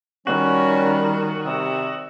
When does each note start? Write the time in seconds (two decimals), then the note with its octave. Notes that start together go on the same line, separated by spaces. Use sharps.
0.27 D#3 G3 C#4 F#4
1.45 C3 G3 D#6 E6